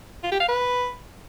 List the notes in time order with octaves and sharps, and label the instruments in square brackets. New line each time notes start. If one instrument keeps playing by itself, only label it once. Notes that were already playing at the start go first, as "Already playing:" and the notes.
[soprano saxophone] F4
G4
F5
B4